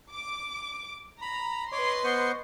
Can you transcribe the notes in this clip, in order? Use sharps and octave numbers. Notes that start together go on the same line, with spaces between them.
D6
A#5 B5
B4 C#5 D#5 C6 D6
B3 C5 C#6